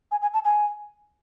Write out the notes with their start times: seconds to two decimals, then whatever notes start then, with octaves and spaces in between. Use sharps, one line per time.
0.11 G#5
0.22 G#5
0.34 A5
0.45 G#5